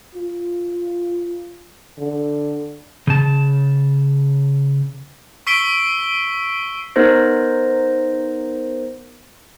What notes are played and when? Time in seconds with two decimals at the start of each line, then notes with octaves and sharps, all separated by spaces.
0.15 F4
1.99 D3
3.07 C#3 A5
5.47 C#6 E6 B6 C7 D7 G7
6.96 B3 D#4 A#4 C5 A#6